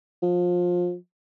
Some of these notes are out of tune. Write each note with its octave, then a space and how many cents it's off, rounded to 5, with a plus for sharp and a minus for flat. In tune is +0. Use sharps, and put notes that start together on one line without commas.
F3 +25